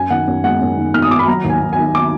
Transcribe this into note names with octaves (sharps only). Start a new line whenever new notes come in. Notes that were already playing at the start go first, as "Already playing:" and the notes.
Already playing: F#2 G#5
D#3 F#5
F#2
G#3 F#5
F#2
D#3
D#3 F6
D#6
D#3 D6
B5
F#3 A#5
D#2
G#5
D#2
G#5
D#3
D6